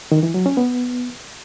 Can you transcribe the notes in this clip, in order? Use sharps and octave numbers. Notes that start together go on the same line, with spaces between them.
D#3
E3
F#3
C#4
B3